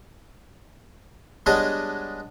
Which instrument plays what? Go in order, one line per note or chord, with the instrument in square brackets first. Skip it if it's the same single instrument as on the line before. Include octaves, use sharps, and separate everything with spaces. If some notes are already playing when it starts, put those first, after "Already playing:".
[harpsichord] G3 G#3 B3 D4 C#5 D#5